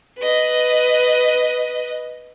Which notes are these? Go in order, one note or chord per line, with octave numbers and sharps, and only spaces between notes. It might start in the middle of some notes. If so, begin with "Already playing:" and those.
B4 D#5